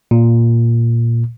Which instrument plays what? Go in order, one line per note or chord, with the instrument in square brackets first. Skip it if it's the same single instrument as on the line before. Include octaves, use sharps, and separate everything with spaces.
[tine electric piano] A#2